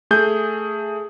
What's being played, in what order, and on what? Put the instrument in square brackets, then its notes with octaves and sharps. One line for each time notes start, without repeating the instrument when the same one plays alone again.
[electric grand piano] A3 G#4 G6